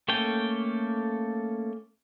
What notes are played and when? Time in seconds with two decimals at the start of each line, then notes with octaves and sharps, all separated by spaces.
0.08 A3 A#3 C#4 A4 G5